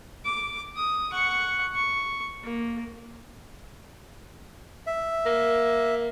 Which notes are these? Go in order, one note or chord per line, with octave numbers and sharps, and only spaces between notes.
D6
D#6
F#5 C#6
C#6
A#3
E5
A#3